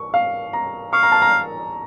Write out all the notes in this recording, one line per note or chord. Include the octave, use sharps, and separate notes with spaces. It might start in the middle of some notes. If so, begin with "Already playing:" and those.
Already playing: C#6
F5
A#5
F5 C#6
A#5
A5
A#5